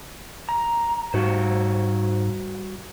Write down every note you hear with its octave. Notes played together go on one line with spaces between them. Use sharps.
A#5
G#2 G3 F#4 C5